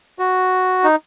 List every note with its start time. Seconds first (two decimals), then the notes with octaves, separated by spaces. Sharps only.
0.19 F#4
0.84 D#4